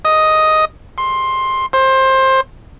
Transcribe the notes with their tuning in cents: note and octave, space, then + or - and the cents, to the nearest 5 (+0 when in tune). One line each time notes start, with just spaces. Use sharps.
D#5 +5
C6 +15
C5 +20